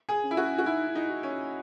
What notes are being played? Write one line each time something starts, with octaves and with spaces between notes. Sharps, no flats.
G#4
C#4
E4
F#4
F#4
D#4 E4
E4
D#4
F#4
C#4
F#4